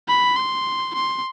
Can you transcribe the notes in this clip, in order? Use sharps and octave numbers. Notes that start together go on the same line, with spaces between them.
B5
C6
C6